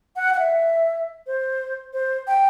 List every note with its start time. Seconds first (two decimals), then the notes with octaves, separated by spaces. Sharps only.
0.16 F#5
0.34 F#5
0.39 E5
1.27 C5
1.93 C5
2.27 G5